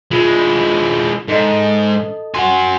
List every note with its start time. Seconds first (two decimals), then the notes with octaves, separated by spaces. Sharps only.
0.11 G#3 E4 F4
1.28 G#2 A4 D#5
2.34 F#4 F#5 G#5 C6